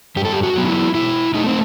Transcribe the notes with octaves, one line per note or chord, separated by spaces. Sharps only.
G2 G4
A4
G4
F#4
F#3 B3
D#4
E4
B2 E4
A3 D#4
C4